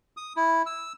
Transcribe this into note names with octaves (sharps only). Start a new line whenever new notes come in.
D#6
E4
E6